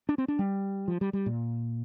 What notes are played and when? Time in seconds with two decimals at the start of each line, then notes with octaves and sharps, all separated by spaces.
0.09 D4
0.18 C4
0.28 D4
0.39 G3
0.88 F3
1.01 G3
1.13 G3
1.26 A#2